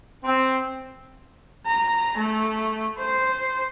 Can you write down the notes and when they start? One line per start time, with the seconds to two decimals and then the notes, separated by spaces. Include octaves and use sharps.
0.24 C4
1.67 A#5
2.18 A3
2.99 C5